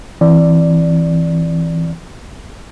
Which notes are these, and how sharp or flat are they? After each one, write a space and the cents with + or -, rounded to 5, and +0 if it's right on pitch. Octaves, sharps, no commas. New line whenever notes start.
E3 +0 C4 +0 D5 +0